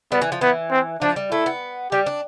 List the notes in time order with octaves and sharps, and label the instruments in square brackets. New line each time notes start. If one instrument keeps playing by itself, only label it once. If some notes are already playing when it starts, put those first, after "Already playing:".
[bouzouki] G3 [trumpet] B3
[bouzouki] E3
F3
[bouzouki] E3 [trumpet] B3
[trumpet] C4
[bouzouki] F3 [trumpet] D4
[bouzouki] G3
[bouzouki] A3 [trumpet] E4
[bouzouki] B3
[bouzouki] G3 [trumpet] G4
[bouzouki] D4